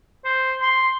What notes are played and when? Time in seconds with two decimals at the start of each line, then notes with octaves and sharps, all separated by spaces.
0.25 C5
0.61 C6